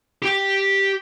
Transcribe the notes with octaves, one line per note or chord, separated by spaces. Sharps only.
G4 G5